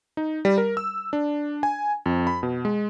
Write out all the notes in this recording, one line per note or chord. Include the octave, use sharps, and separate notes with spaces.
D#4
G3
A#4
E6
D4
G#5
F2
B5
B2
G#3